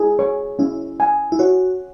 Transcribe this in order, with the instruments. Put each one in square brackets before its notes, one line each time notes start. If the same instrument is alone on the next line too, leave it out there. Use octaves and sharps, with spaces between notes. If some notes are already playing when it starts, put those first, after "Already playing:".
Already playing: [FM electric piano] E4 [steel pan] G#4
[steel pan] C#5
[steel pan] C#4 [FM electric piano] E4
[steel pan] G#5
[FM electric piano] E4
[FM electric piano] F#4 [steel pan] C#5